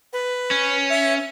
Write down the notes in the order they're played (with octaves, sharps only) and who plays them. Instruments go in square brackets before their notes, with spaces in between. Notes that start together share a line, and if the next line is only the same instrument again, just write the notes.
[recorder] B4
[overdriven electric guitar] C#4
[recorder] E5